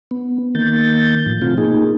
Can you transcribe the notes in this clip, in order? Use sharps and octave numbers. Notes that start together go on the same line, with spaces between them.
B3
D#3 A#3 G6 A6
A2 F3
B2 A3 C4 F4
A#3 D#4 G#4